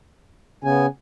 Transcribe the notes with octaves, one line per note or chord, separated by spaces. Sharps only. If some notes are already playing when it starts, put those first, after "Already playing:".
C#3 B3 G#5